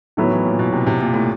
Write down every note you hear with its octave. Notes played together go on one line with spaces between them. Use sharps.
A2 D#3 F#3 B3
E3
A#2
B2
C3
C3
A#2
A2